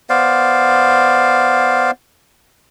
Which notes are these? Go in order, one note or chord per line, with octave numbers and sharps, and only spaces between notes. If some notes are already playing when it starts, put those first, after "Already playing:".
B3 C5 D5 F5